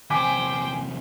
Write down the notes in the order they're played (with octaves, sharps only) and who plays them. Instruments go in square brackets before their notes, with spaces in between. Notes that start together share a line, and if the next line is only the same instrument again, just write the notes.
[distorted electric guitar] E2 C3 [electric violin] C5 G5 [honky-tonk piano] G#5 D6 B6